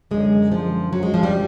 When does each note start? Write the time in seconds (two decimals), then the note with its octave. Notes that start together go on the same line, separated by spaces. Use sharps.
0.11 F#2 D3 G#3
0.52 F3
0.93 F#3
1.03 G#3
1.14 F3
1.23 G3